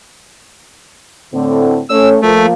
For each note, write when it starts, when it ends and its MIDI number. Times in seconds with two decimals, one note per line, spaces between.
1.33 1.80 45
1.33 1.80 50
1.33 1.80 60
1.90 2.16 57
1.90 2.16 61
1.90 2.16 73
1.90 2.09 88
2.22 2.53 53
2.22 2.46 57
2.22 2.53 58